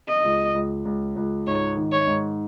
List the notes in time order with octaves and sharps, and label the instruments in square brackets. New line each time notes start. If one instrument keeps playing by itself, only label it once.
[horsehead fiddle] D#5
[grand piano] C#2
C#2
C#2
C#2
[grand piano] G#2 [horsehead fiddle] C#5
[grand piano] D#3
[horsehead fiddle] C#5
[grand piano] G#2